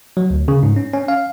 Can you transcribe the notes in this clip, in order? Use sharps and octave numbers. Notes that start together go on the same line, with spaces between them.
F#3
D2
C#3
G#2
C#4
C#4
F5